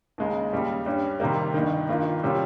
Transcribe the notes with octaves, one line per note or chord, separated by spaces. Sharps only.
D#2 C#3 G#3 D#4
D#2 C#3 G3
G2 G3 C#4
C3 D#3 G3 A#3
G1 G2 D#3
G2 D#3 A#3 F4
C3 G3 C#4 F4